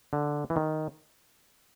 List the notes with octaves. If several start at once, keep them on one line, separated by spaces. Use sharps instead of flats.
D3
E3
D#3